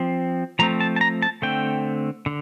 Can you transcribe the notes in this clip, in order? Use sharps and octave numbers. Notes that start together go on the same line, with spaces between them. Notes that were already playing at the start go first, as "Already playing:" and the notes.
Already playing: F3 C4
F3 A3 C4 A#5
A5
A5
A#5
A5
D3 A3 C4 G5
D3